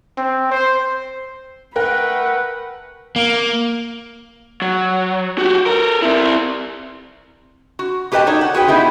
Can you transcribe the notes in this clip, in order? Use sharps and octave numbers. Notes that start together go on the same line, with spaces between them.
C4
C5
A3 A#4 B4 F#5 G5 F#6
A#3
F#3
F#4 G4
A4 A#4
C4 E4
F#4
A#3 G4 B4 D#5 G5 A5
D#4 F#4 A4 C#5 D5
F#5
F#4 G#4 B4 G5
B3 D#4 E4 G4